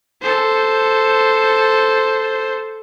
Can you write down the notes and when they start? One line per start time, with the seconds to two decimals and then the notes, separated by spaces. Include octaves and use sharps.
0.21 A4 C5